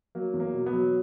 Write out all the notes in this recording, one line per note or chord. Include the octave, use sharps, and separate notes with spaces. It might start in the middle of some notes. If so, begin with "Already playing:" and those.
F#3 A#3
E2
A#3
B2
B3
F#3